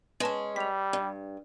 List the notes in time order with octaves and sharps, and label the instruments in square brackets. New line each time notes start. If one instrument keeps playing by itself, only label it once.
[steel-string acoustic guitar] G#3 C#4 [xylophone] B4 D#5 A5
[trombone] G3 [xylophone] B6 F7
[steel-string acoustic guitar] G2